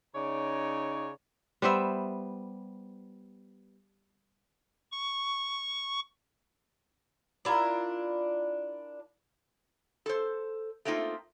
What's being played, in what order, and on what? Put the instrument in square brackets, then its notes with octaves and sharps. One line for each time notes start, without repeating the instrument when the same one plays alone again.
[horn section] C#3 D#4 C#5 D5 A#5
[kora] G3 B3 C5 E5
[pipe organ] C#6
[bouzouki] D4 E4 F4 A#4
[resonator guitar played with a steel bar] A4 C5
A3 A#3 C4 D#4 F4